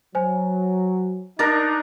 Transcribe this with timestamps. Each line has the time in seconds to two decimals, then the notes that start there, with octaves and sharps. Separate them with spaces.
0.15 F#3 C5 G#5
1.39 D4 D#4 A#4 A6 A#6